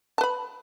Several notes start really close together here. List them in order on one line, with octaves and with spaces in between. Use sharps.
A5 B4 B5